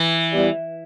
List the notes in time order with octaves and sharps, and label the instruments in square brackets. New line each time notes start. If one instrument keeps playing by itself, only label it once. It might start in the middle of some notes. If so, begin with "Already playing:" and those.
Already playing: [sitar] E3
[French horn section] G3 B3 E4 G4 D5